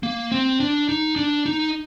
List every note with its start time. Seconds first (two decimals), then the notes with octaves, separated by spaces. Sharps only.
0.03 A#3
0.32 C4
0.60 D4
0.89 D#4
1.16 D4
1.46 D#4